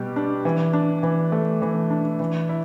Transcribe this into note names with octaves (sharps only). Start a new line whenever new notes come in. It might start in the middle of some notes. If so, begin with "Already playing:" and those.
Already playing: B2 G3 G4
D4
E3
D4
E3
A3
E3
D4
E3
E4